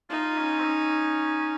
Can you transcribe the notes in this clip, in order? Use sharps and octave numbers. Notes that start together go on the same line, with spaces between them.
D#4 F4
C#4
C4
C#4